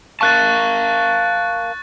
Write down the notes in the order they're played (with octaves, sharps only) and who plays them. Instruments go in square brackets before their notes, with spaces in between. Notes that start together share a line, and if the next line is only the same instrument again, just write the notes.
[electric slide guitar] A#4 F5 A5 [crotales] C#6 F#6 A6